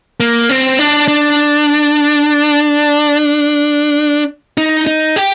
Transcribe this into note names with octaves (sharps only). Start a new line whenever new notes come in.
A#3
C4
D4
D4
D#4
D#4
G4